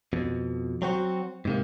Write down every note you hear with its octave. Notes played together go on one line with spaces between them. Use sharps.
F2 B2
F#3 C4 F#4
G#2 C3 A#3